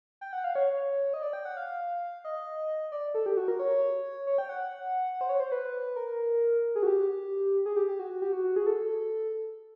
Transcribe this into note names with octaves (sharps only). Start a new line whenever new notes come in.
G5
F#5
F5
C#5
D#5
D5
G5
F#5
F5
D#5
D5
A4
G4
F#4
A#4
C#5
C#5
G5
F#5
C5
C#5
C5
B4
A#4
G#4
F#4
G4
G#4
G4
G4
F#4
F#4
G4
F#4
F#4
G#4
A4